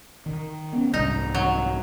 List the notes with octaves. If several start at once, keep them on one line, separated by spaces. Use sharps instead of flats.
D#3
B3 C#4
C2 G#2 D#4
F#3